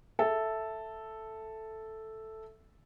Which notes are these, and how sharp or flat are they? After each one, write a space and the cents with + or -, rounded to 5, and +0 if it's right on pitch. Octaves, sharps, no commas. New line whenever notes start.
A4 +0 E5 +0